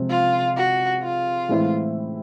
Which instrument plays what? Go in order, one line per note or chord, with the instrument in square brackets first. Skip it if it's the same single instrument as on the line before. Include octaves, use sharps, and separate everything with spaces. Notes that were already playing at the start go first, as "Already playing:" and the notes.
Already playing: [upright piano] C3 F3 G#3 C4
[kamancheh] F4
F#4
F4
[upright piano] A2 E3 G#3 C4 E4